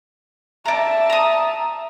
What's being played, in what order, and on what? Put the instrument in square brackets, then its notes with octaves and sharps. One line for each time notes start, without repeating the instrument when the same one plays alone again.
[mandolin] D5 A#5 [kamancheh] E5 A5
[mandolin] A#5 D#6